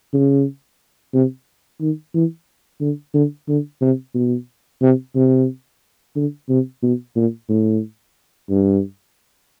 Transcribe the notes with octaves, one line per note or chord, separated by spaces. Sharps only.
C#3
C3
D#3
E3
D3
D3
D3
C3
B2
C3
C3
D3
C3
B2
A#2
A2
G2